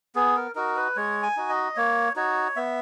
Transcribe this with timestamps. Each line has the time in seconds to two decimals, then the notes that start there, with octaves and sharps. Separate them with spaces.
0.15 B3 G#4
0.36 A#4
0.55 D#4 F#4 A#4
0.76 B4
0.96 G#3 C#5
1.23 G#5
1.37 D#4 F#4
1.49 D#5
1.76 A#3 C#5
2.16 D#4 F#4 C#5
2.56 B3 E5